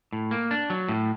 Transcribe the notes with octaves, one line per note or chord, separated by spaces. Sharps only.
A2
A#3
D4
F#3
A2